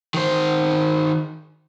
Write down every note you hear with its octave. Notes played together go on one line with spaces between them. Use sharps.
D#3 C5